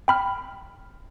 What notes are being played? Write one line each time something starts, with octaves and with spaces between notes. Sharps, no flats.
G5 B5 F6